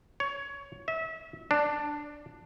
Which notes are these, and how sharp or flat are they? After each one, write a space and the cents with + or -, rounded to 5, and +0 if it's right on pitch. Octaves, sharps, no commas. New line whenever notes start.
C#5 +15
E5 -30
D4 +5